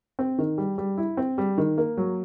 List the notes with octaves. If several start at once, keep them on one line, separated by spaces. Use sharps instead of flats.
C4
D#3
G3
G3
E4
C4
G3
D#3
A#3
F#3